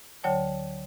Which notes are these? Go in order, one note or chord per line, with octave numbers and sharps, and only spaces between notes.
D2 D3 F#3 C#5 G5 A5